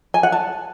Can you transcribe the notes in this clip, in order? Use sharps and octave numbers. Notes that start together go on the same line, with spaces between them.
G#5
F#5
A5